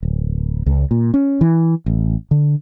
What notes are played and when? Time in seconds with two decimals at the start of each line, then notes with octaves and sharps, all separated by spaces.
0.03 D1
0.66 C#2
0.91 A#2
1.14 C#4
1.41 E3
1.86 A1
2.31 D3